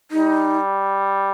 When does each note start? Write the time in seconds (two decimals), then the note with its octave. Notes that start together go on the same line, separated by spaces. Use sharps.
0.11 G3 D#4